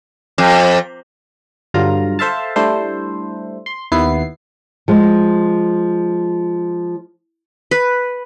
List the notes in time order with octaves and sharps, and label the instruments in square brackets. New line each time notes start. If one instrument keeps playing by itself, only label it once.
[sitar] F2
[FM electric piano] G2 D3 F#3 F4 A#5
A4 C5 E5 F5 A5
G3 A3 D4 E4 A4 C5
C6
D#2 B3 E4 C7
[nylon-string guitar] F3 G#3
[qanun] B4